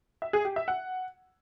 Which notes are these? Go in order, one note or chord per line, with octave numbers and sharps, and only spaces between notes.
E5
G#4
G4
E5
F#5